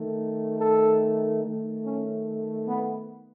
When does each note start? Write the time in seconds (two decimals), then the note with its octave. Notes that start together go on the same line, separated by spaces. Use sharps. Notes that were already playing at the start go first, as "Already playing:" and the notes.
Already playing: D#3 A3
0.58 A4
1.42 D#3 A3
1.83 C#4
2.68 B3